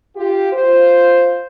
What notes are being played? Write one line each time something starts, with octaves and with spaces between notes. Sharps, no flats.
F4 G4
F4 C5